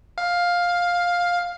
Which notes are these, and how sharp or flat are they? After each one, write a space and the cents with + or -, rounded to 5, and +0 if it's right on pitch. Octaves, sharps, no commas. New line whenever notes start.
F5 +10